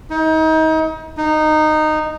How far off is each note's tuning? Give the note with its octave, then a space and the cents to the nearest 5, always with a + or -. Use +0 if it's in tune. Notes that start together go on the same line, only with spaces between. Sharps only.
D#4 +30
D#4 -15